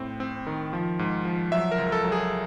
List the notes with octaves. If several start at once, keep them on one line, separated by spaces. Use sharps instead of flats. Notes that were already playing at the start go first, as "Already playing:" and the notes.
Already playing: A2 C4
C4
D#3
F3
G#2
F3
F#3 E5
A#4
C#2
A4
F#3
G#4